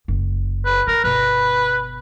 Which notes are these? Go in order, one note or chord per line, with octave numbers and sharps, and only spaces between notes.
F#1
B4
D#3 A#4
G1 B2 B4